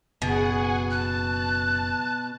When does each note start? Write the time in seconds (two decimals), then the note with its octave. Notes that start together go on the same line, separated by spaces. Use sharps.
0.22 F#1 B2 G#4 F#5 G#5
0.91 A5 F#6